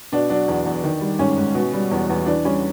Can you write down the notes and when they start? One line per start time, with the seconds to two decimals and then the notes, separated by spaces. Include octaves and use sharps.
0.12 B2 D4
0.30 F#3 D4
0.48 E2
0.66 E2
0.84 D#3
1.01 G3
1.19 G#2 C#4
1.37 G#2
1.55 B2
1.73 G3
1.91 E2
2.09 E2
2.26 E3 D4
2.45 G3 C#4